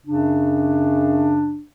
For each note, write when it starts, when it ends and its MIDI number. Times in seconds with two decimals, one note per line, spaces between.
0.06 1.62 42
0.06 1.62 49
0.06 1.62 62